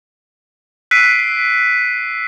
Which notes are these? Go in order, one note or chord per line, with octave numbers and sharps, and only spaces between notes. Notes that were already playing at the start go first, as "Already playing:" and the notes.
E6 F#6 B6 C7 D7 D#7